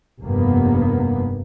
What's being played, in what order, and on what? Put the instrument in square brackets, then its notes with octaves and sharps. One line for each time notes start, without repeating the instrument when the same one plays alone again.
[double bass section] F1 G2 A#3 B3